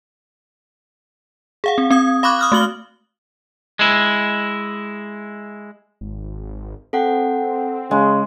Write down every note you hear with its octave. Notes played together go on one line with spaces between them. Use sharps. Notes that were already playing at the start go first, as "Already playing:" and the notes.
G#4 F5 F#5
C4
C4 D#6 G#6
F5 B5 C#6 D6 F#6
D#6 F6 F#6
A3 F#4 F#7 G7
G#3 E4
G#1
C4 A4 F#5 G5
C#3 G#3